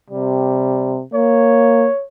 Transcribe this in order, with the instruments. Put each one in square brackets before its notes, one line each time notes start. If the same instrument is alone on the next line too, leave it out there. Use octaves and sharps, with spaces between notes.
[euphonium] C3 [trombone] G3
[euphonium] A#3 [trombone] C#5